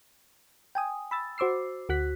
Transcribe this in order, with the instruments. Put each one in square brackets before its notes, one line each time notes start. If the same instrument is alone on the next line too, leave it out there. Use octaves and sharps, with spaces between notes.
[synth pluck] G5 G#5 D#6
B5 E6 A6
F#4 C5 D6 E6 C7
D2 F#4 F#6 B6